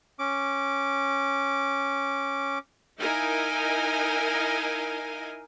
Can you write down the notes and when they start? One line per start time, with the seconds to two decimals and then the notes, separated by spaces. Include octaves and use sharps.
0.19 C#4 D6
2.98 D#4 E4 A#4 D#5 F5 G#5